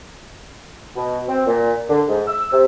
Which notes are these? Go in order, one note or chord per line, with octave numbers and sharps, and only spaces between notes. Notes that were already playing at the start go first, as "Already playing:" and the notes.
B2
C4
A#2
D3
G#2
E6
C3